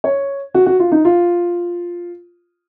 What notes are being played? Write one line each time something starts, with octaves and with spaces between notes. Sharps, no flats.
C#5
F#4
F#4
F4
D#4
F4